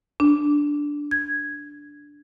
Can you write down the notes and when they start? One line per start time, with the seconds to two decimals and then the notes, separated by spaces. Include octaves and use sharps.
0.20 D4
1.11 G#6